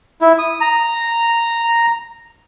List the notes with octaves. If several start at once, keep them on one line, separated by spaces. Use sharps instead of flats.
E4
D#6
A#5